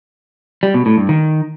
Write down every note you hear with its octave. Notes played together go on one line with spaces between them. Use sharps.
G3
B2
A2
G2
D#3